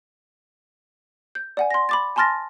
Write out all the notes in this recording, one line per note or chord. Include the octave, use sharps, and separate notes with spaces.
G6
D5 F#5 G#5
C6 A#6
B5 D6 A6
G#5 A5 C6 F6 A6 A#6